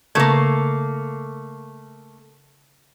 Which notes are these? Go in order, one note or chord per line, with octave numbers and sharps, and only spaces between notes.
C#3 A3 A#3 C#6 G#6